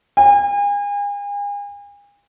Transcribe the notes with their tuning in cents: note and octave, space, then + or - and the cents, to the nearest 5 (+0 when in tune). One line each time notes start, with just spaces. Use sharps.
G#5 -40